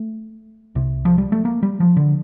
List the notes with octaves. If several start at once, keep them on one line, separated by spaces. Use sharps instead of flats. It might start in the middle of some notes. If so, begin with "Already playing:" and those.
Already playing: A3
C2 C3
F3
G3
A3
A#3
G3
F3
D3